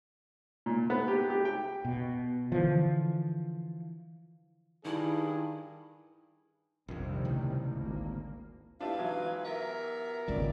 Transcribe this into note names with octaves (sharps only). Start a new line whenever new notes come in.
A#2
B3
G4
G4
G5
B2
D3 E3 F3
G2 D#3 E4 G#4
A#1 F2 C3 D#3 G3
C#2 A2
G#1 D2 A#3
G#2 D4 E4 F4 G4 B4 F5
E3 F#3
B3 G4 A#4 E5
D#1 G#1 C#2 D5